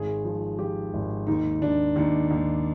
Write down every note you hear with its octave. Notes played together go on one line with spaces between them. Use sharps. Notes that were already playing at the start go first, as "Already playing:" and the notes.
Already playing: G#1 G#4
F3
F3 G4
G#1
D#2 D#4
D#2 D4
D#2 D#4
D#2